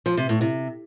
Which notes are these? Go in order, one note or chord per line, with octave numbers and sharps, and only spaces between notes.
F3
C3
A2
C3